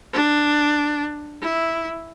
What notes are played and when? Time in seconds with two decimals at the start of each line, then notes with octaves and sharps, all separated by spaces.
0.13 D4
1.41 E4